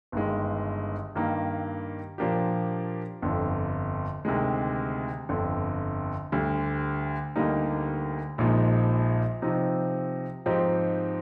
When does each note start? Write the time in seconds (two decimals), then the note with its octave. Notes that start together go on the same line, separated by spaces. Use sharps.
0.12 G1 G2 D#3 G#3
1.15 G2 D#3 A#3
2.18 A#2 F3 A#3 D4 G4
3.22 G1 F2 D3
4.25 D2 C3 D#3 G#3
5.29 G1 F2 D3
6.32 D2 D3 G3
7.36 D2 D3 G3 A#3 D#4
8.38 A#1 A#2 F3 G#3 D#4
9.42 C3 F3 C4 D#4
10.46 G#2 F3 C4 D#4 G4